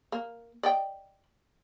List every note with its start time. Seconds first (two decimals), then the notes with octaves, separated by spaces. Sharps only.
0.12 A#3
0.63 D5 D#5 G5